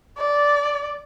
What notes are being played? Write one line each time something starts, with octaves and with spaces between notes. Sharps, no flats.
D5